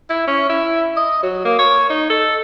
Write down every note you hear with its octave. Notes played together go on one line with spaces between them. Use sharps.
E4
C#4
E4
D#5
F#3
A#3
C#5
D#4
A4